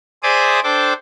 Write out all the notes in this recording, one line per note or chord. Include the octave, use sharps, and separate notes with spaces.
G#4 C5 D5 E5 D6 D#6
D4 A4 C5 G5 D6